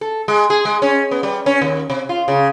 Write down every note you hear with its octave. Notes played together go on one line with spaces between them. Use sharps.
A4
G#3
G#4
G#3
C#4
B3
G3
C#4
D#2
C3
F4
C#3